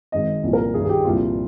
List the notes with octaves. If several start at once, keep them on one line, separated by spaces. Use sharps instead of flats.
G#1 G#2 D#3 D#5
C2 A#2 F3
A#4
G1 G2 D#3 G#4
G#4
G4
C2 A#2 F3 F4